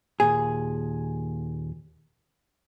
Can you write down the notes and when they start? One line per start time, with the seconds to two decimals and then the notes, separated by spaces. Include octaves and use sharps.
0.20 D#2 A#2 G#4